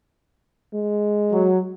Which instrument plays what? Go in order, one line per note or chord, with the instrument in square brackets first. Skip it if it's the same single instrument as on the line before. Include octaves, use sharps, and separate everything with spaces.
[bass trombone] G#3
[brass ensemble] F#3